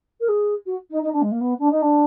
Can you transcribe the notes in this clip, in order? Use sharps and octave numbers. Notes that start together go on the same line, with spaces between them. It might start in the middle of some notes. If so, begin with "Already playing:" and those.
A#4
G#4
F#4
D#4
D#4
D4
G#3
A#3
B3
D4
D#4
D4